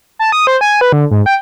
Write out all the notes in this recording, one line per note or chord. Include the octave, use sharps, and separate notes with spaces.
A5
D#6
C5
G#5
B4
D3
G#2
G5